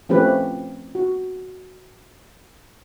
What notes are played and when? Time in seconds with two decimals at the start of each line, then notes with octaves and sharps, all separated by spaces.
0.09 F3 A3 C4 C#4 G4 B4
0.95 F#4